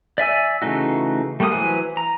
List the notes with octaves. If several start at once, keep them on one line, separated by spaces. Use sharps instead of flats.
D5 E5 G#5 E6
C#3 E3 A3 D#4 F#4
G3 A3 A#3 F#5 D#6
E3 F#3 B4 C5 G#5
A#5